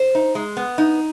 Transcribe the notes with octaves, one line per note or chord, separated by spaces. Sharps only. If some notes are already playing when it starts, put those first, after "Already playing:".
Already playing: C5
D#4
G#3
B3
D#4